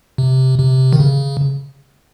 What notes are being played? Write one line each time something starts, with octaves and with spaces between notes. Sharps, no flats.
C3
C3
D#3
C#3